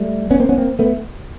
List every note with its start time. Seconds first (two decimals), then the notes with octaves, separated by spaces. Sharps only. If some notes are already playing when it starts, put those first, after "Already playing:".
Already playing: G3 A3
0.31 B3 C#4
0.40 A#3 C4
0.49 B3 C#4
0.58 A#3 C4
0.79 A3 B3